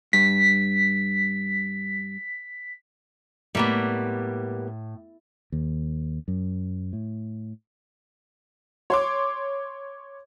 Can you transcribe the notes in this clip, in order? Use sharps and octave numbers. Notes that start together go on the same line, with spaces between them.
G2 B6
A2 G3 A#3 B3
D#2
F#2
A2
C#5 C6 D6